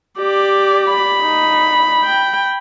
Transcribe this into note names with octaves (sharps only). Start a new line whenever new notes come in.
G4 D5
B5
D#4
G5